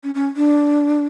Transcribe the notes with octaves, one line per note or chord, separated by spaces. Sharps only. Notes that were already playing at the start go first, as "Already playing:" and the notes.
C#4
C#4
D4